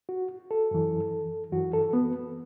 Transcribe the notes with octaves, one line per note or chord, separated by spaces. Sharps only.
F#4
A4
F#2 E3
F#2 E3 F#4
A4
B3